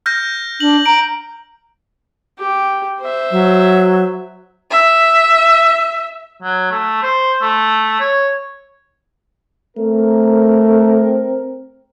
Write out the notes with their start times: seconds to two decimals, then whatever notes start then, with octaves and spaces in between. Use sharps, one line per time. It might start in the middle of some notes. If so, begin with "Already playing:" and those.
0.06 F6 G6 A#6
0.60 D4 F#7
0.86 A#5 D7
2.39 G4
3.01 C5 E5
3.31 F#3
4.71 E5
6.42 F#3
6.71 A3
7.02 C5
7.42 A3
8.00 C#5
9.78 A3 C4 A#4